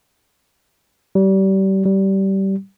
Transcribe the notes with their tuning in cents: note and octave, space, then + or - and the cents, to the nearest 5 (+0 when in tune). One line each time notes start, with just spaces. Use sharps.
G3 -30
G3 -20